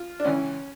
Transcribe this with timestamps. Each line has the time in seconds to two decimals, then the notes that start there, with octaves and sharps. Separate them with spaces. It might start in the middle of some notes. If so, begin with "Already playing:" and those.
Already playing: F4
0.20 D4
0.25 C#2 C#3 E3 C#4